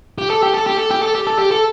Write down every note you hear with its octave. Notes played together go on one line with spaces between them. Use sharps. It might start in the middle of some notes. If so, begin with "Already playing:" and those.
G4
A4
G4
A4
G4
A4
G4
A4
G4
A4
G4
A4